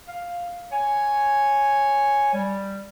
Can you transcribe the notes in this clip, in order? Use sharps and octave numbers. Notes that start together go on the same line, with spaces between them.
F5
C#5 G#5
G3